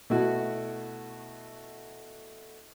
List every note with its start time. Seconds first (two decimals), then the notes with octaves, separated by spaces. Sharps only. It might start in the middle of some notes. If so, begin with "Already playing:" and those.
0.10 B2 A3 E4 F#4